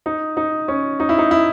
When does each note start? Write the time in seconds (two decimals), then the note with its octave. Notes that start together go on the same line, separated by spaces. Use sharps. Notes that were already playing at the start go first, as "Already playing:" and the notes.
0.06 D#4
0.37 D#4
0.68 C#4
1.00 D#4
1.09 E4
1.18 D#4
1.31 E4